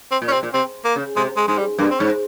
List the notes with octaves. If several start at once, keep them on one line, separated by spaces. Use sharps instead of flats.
C4
A#2
C#4
C3 C4
A#2
C3 C4
A#3
C#3
C3 G#3
G#3
G#2 G#3
G3
G2 A#3
C4
G#2 C#4